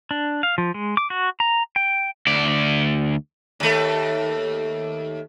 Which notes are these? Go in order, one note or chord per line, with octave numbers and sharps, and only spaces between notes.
D4
F5
F3
G#3
D6
F#4
A#5
G5
D2 D5
D#2 A3